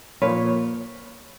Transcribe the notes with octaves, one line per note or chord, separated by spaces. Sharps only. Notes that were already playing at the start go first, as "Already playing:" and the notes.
A#2 F3 A#3 B4 C#5